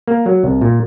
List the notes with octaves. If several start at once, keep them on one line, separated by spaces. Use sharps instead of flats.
A#3
F#3
C2
A#2